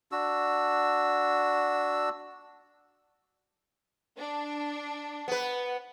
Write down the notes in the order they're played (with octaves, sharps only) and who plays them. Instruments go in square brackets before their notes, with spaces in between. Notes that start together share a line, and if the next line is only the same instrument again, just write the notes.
[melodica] D4 F#4 E6
[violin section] D4
[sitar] B3 B4